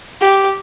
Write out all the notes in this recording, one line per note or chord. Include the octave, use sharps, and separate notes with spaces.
G4